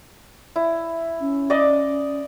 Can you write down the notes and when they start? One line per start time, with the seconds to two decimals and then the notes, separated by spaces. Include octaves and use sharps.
0.56 E4
1.20 C#4
1.50 D5 D#5 D6